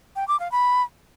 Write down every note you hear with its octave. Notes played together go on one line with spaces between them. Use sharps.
G5
D6
F5
B5